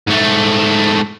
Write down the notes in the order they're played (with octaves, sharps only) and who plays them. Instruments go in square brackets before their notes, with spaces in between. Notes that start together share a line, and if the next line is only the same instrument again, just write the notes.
[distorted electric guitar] G#2 A3